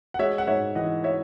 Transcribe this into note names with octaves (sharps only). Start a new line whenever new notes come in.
F#5
G#3 C#5 E5
F#5
G#2 C#5 E5
E3 D#5 F#5
C#5 E5